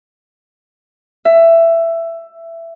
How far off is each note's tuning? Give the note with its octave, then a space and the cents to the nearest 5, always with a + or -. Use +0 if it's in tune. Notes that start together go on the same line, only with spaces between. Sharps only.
E5 +15